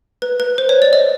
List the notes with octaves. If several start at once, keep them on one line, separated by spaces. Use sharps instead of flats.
B4
B4
C5
C#5
D5
D#5